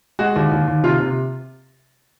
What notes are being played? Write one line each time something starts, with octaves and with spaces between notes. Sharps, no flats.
G#3 F#4
D#2
D#2
D#2
C3 F4
C3